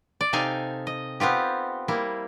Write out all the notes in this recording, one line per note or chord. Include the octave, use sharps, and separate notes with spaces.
D5
C3 D#4 A4 F5 G5 G#5
D#5
B3 C4 F4 G4
G3 A#3 E4